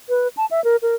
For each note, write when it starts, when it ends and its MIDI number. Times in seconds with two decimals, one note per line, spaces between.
0.09 0.28 71
0.37 0.46 81
0.51 0.63 76
0.64 0.76 70
0.82 0.95 70